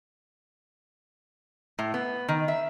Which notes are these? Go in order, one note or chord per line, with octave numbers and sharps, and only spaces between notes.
A2
B3
D#3
E5